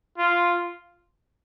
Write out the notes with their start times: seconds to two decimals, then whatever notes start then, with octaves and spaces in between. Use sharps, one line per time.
0.18 F4